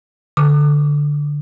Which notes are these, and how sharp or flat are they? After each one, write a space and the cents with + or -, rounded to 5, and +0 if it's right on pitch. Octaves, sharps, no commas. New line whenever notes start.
D3 +0 D6 -35